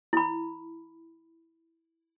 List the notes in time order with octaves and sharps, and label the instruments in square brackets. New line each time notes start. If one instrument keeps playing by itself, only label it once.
[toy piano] E4 B5